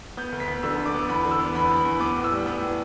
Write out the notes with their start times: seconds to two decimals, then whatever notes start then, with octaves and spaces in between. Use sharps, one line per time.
0.17 B3 G6
0.32 D2
0.40 B6
0.48 B3
0.63 D3 E6
0.78 D3
0.86 D6
0.94 B3
1.09 E2 B5
1.25 D3
1.31 E6
1.39 B3
1.55 E2 B5
1.71 B3
1.85 E2
2.00 B3 D6
2.16 A2
2.24 E6
2.31 G3
2.46 B3
2.61 A2